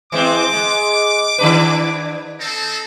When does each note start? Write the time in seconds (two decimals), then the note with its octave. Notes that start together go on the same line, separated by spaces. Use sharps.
0.12 E3 G#3 C4 D6
0.53 G#3
1.38 D#3 D4 B4
2.40 C4 D#4 A4